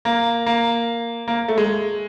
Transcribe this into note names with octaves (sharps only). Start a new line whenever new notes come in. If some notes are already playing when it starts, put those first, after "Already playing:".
A#3
A#3
A#3
A3
G#3